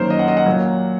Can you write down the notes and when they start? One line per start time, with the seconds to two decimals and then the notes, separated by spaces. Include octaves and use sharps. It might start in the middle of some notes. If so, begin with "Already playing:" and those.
Already playing: F#2 D#3 F#3 A#3 A#4 C5
0.10 D#5
0.19 F#5
0.28 D#5
0.37 F#5
0.46 A#2 F#3 A#3